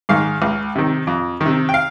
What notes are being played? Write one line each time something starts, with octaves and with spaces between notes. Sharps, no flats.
G#2 D#3 F5
C#2
C3 D#3
F2
D#3
C3
G5
F5